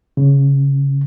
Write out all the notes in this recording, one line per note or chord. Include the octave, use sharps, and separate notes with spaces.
C#3